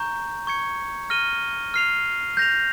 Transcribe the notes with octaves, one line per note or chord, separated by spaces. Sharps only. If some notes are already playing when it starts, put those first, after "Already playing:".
Already playing: A#5 C#6 G6
C#6 G#6 C#7
F6 A#6 D#7 G7
F6 C7 F7
G6 A#6 F7